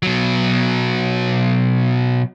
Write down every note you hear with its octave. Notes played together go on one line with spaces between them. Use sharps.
B2 F#3